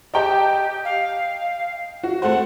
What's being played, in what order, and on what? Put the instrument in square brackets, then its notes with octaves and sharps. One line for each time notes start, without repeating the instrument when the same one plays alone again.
[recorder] G4 [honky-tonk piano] D#5 G5 A5
[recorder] F5
[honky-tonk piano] F#4
[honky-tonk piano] A3 C4 C5 [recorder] F#5